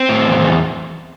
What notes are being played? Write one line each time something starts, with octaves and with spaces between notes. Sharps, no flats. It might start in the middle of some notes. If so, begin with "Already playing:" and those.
Already playing: C4
A2
E2
E2